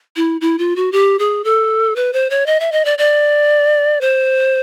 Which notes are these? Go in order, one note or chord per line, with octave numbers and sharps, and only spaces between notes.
E4
E4
F4
F#4
G4
G#4
A4
B4
C5
C#5
D#5
E5
D#5
D5
D5
C5